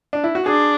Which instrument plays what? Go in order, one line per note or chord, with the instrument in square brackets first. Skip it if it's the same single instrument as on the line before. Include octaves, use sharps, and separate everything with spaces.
[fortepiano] D4
E4
F#4
[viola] D4 [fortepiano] G#4